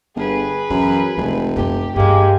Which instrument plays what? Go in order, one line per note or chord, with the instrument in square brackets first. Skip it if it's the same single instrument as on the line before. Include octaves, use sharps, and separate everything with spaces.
[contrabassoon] G1 [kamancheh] G#4 B4
[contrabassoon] F#2 [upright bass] E3
[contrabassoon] F1 [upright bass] E3 G#3
[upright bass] F#2 B3 [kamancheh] G4
[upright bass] G2 B3 [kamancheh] G#3 A#3 [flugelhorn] G4